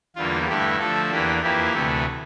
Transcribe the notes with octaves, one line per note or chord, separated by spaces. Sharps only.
E2 D3 G3 A#3 F4
G2 D3 A3 E4 G4
D3 F3 A3 A4
E2 E3 A#3 D4 G4
F2 E3 A#3 E4 G4
D2 C3 E3 A3